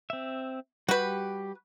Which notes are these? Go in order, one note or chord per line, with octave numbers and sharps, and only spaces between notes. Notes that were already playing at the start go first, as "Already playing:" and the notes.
C4 E5
G3 F#4 G4 B4 G6